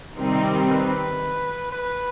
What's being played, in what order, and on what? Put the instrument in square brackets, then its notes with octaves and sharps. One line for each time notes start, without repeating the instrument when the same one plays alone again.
[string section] C3 D#3 G3 C4 D#4 [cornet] A#4
[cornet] B4
B4